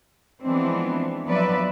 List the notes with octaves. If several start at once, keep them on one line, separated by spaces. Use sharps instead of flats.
E3 F3 G#3 B3 C4 D4
F3 F#3 B3 B4 D5 E5